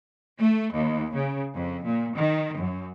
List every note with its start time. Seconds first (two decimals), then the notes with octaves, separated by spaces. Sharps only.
0.39 A3
0.73 D#2
1.13 C#3
1.55 F2
1.88 A#2
2.17 D#3
2.59 F#2